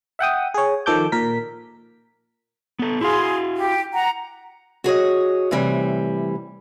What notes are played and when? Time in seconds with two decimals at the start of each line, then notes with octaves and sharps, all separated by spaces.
0.19 E5 F#5 G5 D#6
0.54 G#4 C#5
0.86 D#3 F3 A4 D6 G6
1.12 A#2 A#4 B6
2.79 B3 A4
3.01 E4 F#4 G#4 F5 C6
3.56 G4
3.93 F#5 A#5
4.84 F#4 G#4 C#5 D#5
5.51 A2 C3 E3 G3